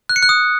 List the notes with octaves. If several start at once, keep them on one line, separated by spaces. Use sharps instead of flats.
F#6
C#7
F#6
D#6